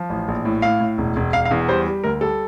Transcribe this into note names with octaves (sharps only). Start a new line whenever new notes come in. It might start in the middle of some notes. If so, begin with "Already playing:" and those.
Already playing: F3
A1
A#1
A2
A2 F5
A2
E1
E1
E1 F5
F5
E2
G3 C5
G3
D2 A#4
G3 A4